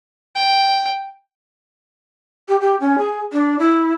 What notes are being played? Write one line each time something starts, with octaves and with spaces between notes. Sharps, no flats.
G5
G4
G4
C#4
G#4
D4
E4